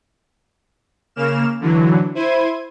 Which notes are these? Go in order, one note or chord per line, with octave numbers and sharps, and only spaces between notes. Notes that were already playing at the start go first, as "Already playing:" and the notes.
C#3 A#3 F6 E7
D3 E3 F#3
E4 C5 G#6 D#7